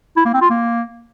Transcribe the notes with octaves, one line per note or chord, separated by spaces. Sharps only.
E4
A#3
C4
F4
A#3